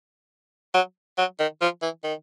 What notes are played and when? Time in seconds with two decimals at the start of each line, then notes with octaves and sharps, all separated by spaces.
0.74 F#3
1.18 F#3
1.40 D#3
1.61 F3
1.82 E3
2.04 D#3